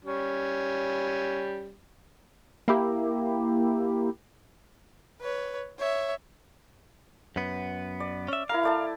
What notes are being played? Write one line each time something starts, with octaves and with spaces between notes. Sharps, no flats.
G3 C#4
A#3 E4 G4
B4 C#5
C#5 E5
F#2 B3
D5
C#4 E5
E4 A#4 F5 A#5
A3 D5 A5